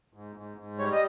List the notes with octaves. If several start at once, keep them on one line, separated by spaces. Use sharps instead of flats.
G#2
G#2
G#2
G3 C#5
D#5